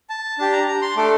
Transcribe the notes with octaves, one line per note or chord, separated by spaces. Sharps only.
A5
D4 G4 A5
A#5
A#5
C6
A3 D4 A4 D6